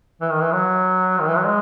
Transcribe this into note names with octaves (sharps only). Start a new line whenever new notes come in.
E3
D#3
E3
F#3
D#3
E3
F#3
G#3